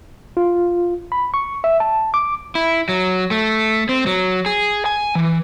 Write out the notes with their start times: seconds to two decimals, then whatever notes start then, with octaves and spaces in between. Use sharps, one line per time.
0.37 F4
1.12 B5
1.34 C#6
1.64 E5
1.80 A5
2.14 D6
2.55 E4
2.89 F#3
3.31 A3
3.89 C4
4.07 F#3
4.46 G#4
4.86 G#5
5.15 E3